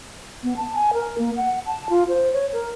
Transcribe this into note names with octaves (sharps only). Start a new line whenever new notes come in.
B3
A5
G#5
A#4
A#3
F#5
A5
F4
C5
C#5
A#4